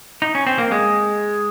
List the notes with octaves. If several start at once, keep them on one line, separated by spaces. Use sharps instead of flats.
D#4
C#4
C4
A#3
G#3